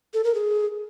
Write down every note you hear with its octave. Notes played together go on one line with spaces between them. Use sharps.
A4
A#4
G#4